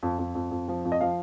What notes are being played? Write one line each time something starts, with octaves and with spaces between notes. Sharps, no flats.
F2
F2
F2
F2
F3
F2
D#5
F3 F5